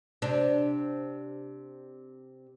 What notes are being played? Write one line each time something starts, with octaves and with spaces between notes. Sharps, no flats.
C3 D4